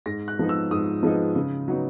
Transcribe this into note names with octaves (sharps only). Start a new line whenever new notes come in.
G#2 A#6
F#6
F3 G#3 B3 D#4
E6
G#2 D#6
F3 G#3 B3 D#4
C#3
F#3 B3 D#4